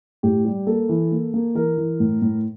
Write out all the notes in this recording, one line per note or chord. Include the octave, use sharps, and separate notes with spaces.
A2 G4
G3
A#3 A4
E3
A#3
A#3
E3 A#4
E3
A2
A2